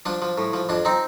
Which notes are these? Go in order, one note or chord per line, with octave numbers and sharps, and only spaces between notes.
F3 D4
F3
A2
F3
F2 D4
C4 D#4